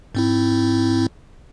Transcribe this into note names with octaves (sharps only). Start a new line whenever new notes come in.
G#2 C4 E4